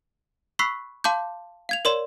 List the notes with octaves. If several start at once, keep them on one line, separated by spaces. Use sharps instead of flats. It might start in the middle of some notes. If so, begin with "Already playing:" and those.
B5 C#6 E6 F#6 B6 C7
F5 A5 C6 D6 G6
F5 G#6 F7
A#4 C#5 D5 C6 E7